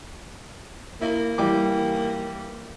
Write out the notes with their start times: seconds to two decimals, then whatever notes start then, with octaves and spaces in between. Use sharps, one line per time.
1.01 A#3 E4
1.38 E3 G3 D6